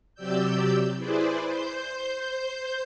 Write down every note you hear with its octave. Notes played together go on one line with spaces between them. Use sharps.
C3 F#3 G4 D5 E6 G6
E4 G#4 B4 C5 D5
C5 G6